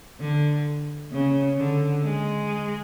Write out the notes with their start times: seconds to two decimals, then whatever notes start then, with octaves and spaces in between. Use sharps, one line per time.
0.20 D3
1.12 C#3
1.57 D3
2.04 G#3